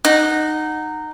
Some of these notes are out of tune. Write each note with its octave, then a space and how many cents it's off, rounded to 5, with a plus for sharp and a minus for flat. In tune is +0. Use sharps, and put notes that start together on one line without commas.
D#4 -15 F#5 +0